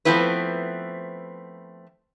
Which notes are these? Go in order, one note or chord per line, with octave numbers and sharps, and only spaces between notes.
F3 A3 B3 C4 E4 B4